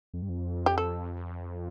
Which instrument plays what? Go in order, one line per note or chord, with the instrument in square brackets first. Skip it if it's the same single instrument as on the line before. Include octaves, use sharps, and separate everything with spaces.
[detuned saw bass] F2
G2
F2
[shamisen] G4
A4